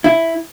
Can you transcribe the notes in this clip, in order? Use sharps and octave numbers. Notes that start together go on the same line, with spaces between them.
E4